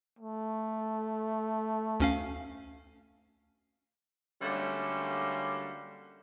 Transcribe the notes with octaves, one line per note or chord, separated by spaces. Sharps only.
A3
D2 C#4 F5
D3 F#3 G3 A3 A#3 C#4